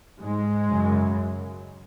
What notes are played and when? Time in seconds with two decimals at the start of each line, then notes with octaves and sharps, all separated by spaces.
0.20 G#2 G#3
0.69 F#2 C#3